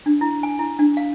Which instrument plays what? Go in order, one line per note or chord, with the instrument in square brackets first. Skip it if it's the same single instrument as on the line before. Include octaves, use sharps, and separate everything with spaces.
[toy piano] D4
E4
G#5
E4
D4
F5